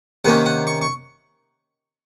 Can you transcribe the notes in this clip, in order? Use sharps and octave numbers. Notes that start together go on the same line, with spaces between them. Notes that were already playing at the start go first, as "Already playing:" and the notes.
C3 D#3 A#3 C#4 F#5
F#5
C#6
C#6